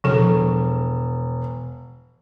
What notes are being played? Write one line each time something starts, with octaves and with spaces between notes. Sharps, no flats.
E1 F3 A4